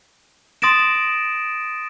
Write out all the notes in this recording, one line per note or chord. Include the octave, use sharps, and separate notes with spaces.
C6 D#6 A6 A#6 D7 E7